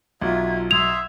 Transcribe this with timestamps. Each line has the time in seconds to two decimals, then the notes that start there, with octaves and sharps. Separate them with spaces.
0.22 B1 F#3 F4 E5 G#6
0.71 E5 C6 D#6 G#6 F7